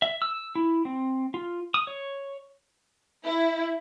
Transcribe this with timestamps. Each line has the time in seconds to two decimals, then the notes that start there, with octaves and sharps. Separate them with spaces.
0.02 E5
0.22 E6
0.55 E4
0.85 C4
1.34 F4
1.74 D#6
1.87 C#5
3.24 E4